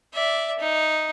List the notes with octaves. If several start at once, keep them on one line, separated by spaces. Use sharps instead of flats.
D5 E5
D#4